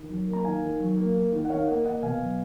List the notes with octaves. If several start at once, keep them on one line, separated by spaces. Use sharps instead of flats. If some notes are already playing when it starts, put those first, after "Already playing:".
Already playing: D#3
F#3
A#3
A#5
D#3 F5 G#5
D#3
F#3
A#3
A#3
D#3
F#5
D#3 C#5 F5
A#3 D#5 F#5
A#3 D#5 F#5
B2 F5 G#5
F#3